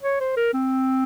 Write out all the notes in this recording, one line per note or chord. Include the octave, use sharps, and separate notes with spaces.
C#5
C5
A#4
C4